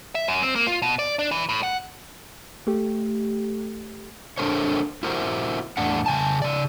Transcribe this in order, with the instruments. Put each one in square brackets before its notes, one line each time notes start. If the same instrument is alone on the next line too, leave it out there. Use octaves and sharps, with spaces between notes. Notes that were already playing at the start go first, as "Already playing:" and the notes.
[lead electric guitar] E5
F#2
C4
A#3
F4
B2
D5
D4
E3
A2
F#5
[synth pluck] A3 G4
[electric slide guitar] D4 A4 A#4 C5 C#5
E4 F#4 A#4 C5
E2 A2 D4 F#5
C#3 G#5 A5
C#3 D5